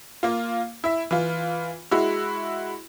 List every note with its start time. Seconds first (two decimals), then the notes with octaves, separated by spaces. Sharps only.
0.23 A#3 F4
0.84 E4 E5
1.11 E3 F4
1.91 G#3 E4 F#4